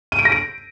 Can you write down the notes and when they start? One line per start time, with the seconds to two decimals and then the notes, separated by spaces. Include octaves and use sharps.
0.12 D#7
0.19 D7
0.25 A#6
0.32 D7